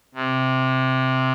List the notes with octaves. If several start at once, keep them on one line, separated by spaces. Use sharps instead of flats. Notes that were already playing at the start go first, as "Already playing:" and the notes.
C3